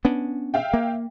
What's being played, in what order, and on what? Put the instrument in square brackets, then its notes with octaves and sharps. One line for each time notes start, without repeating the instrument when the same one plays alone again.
[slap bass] B3 C#4 D4
[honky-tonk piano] E5 F5 G5
[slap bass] A#3